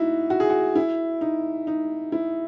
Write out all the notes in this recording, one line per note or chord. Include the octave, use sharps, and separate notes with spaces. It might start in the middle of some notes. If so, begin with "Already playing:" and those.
Already playing: D#4 E4 F#4
F#4
G#4
F#4
E4
D#4
D#4
E4